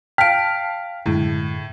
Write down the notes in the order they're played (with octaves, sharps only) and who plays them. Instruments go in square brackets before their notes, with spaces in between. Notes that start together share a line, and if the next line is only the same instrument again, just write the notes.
[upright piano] F5 F6 [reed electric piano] G5 [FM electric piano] A5 [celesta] B6 D7
[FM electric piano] F#2 D3 G#3 [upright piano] A2